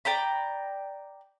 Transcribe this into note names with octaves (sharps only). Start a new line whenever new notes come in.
D5 G5 A#5 B5